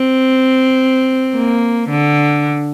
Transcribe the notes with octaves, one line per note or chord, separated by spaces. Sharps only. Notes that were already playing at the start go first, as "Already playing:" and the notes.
Already playing: C4
A#3
D3